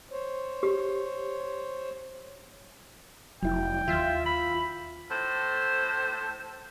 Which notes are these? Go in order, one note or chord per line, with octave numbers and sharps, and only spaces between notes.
C5 C#5
G4
F1 F#3 E4 G5
D#2 F4 E5
B5
A2 A4 C5